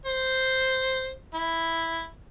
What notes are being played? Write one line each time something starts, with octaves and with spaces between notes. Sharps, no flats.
C5
E4